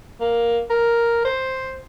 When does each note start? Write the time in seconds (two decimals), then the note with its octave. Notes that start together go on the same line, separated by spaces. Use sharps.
0.21 A#3
0.70 A#4
1.25 C5